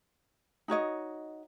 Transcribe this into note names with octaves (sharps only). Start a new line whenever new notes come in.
D#4 F#4 C#5 D#5